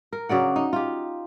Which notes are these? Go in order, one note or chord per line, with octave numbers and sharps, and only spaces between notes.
A#4
C#3 F#3 D5 F#5
D#4
F4 G4